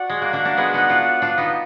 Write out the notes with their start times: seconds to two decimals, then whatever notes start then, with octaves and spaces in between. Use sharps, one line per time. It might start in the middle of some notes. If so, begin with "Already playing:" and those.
Already playing: F#4 D5 F#5
0.09 G#3
0.22 A#3
0.33 A#3 D4
0.45 A#3 D4
0.57 G#3 B3
0.74 B3 D#4
0.89 D4 F4
1.22 D4 F4
1.38 B3 D#4